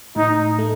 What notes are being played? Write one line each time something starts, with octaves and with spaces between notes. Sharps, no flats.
A2 D#4
A3